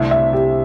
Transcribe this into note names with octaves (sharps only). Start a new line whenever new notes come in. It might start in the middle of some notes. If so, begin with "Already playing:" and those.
Already playing: C2 C3 A3 C4 D4 A4 E5
E5
G4